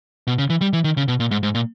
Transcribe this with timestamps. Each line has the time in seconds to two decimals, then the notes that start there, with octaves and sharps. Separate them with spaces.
0.27 B2
0.38 C#3
0.50 E3
0.61 G3
0.73 E3
0.84 D#3
0.97 C#3
1.08 B2
1.20 A#2
1.31 G#2
1.43 G#2
1.55 A#2